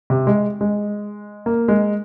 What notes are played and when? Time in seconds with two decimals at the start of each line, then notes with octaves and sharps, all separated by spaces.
0.10 C3
0.27 G#3
0.61 G#3
1.46 A#3
1.68 G#3